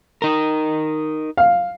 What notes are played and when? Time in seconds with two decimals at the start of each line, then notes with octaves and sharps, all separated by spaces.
0.22 D#4 A#4
1.37 F5